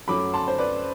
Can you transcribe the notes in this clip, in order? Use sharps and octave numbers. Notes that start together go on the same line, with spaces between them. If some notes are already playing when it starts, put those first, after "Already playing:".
F#2 F#3 A3 B5 D6
A5 C6
C5
B4 D5